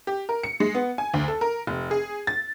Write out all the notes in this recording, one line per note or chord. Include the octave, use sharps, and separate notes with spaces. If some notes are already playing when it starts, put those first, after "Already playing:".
G4
A#4
C#7
G#3
B3
G#5
D2
A4
A#4
F1
G#4
A6